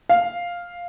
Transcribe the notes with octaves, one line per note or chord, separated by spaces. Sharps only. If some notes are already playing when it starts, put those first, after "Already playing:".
F5